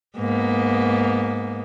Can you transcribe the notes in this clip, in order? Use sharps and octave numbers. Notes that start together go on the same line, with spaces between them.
G#2 A#3 B3